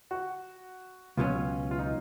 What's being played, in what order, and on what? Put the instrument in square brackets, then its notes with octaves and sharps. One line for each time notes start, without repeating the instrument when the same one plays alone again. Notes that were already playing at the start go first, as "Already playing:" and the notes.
[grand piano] F#4
[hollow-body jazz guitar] C#2 B2 F#3 C#4 [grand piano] F4
[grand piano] F4
D#4